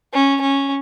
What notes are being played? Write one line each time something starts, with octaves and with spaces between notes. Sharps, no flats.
C#4
C#4